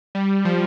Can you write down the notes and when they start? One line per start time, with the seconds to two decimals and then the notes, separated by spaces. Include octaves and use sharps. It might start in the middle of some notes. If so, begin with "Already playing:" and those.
0.15 G3
0.45 F3